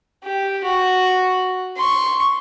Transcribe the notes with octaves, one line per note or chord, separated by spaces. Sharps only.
G4
F#4
C6 C#6